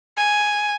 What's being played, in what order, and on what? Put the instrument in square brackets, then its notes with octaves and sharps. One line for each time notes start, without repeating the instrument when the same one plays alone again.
[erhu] G#5